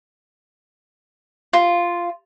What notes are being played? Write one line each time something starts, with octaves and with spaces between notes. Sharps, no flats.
F4